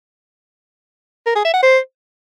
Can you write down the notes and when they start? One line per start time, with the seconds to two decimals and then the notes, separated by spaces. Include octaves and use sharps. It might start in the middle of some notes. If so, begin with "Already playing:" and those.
1.26 A#4
1.35 G#4
1.44 E5
1.53 F#5
1.63 C5